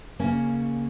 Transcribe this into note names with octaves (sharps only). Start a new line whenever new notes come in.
C#3 A#3 C#4